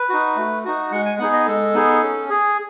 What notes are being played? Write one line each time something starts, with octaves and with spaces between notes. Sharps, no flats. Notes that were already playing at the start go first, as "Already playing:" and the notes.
Already playing: B4
D#4 F#4
A3
D#4 F#4
G#3 F#5
G#5
B3 D#4 G#4 F#5
D#5
G#3 A4
B3 D#4 G#4
C#4
G#4